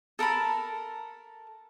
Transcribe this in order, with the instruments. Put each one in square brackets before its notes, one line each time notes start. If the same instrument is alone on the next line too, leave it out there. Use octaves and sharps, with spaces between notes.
[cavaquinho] A4 A#4 A5 B5